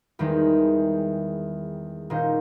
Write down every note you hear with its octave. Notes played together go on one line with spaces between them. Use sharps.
E2 D#3 G3 G#3 D#4
A#2 D#3 C#4 D#4 C5